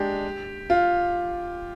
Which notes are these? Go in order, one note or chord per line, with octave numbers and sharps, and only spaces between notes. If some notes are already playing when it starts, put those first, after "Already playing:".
Already playing: G#3 D4 G4
F4